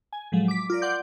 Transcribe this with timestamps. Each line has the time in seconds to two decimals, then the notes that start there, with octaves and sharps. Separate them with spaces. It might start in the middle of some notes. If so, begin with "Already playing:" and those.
0.13 G#5
0.32 A2 F3 F#3 G#3
0.48 D6 B6
0.70 F4 A#4 D5
0.82 D5 F#5 C6 D6 G6